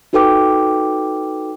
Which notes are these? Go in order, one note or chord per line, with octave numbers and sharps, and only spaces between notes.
D#4 F#4 A4 B4 G5 D6